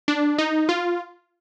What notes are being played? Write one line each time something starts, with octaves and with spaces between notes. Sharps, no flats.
D4
D#4
F4